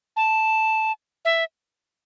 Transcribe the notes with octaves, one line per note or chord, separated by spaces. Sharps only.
A5
E5